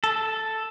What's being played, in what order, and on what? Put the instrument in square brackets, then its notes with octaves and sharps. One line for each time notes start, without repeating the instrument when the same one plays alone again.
[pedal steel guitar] A4